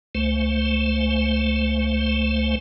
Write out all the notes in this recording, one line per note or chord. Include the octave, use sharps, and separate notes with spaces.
C#2 A3 C5